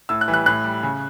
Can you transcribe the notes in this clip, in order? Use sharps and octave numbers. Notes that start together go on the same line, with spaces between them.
A2 E6
F#6
E3 G3
F#6
A2 F#6
G3
C#3